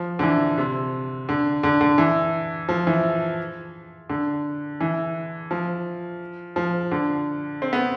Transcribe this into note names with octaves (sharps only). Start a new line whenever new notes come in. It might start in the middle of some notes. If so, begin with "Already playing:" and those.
Already playing: F3
D3
E3
C3
D3
D3
D3
E3
F3
E3
D3
E3
F3
F3
D3
C4
B3